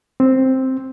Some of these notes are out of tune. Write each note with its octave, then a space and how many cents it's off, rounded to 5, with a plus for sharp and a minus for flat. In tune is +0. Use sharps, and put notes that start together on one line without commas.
C4 +5